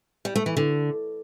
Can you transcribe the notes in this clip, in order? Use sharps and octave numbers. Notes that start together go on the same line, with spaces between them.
G3
A3
E3
D3